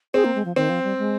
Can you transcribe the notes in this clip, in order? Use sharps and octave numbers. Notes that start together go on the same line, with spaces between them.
C4 G#4
A#3
G#3
F3
D#3 C4
F3
G3
G#3